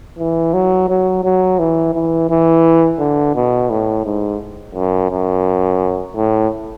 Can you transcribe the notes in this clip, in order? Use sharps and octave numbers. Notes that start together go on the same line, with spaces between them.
E3
F#3
F#3
F#3
E3
E3
E3
D3
B2
A2
G#2
F#2
F#2
A2